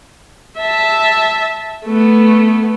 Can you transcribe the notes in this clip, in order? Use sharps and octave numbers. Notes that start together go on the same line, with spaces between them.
E5 A5
A3 B3